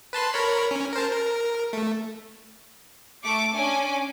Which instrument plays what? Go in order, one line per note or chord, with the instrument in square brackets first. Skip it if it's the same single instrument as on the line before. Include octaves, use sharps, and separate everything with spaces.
[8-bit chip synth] B4 A5 C6
A#4 C#5 B5
C#4
A#4 C5 A5
A#4
A3
[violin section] A3 C#6 D6
C#4 D4 G#5 D6